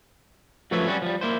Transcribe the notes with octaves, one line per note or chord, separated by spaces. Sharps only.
F#2 F3 A3 B4 C#5 E5
F#3 G3 C#4 F#4
F3 G3
A#3 E4 C5